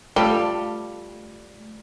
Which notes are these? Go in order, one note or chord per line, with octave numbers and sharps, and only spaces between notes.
G3 A3 F4 A4 F5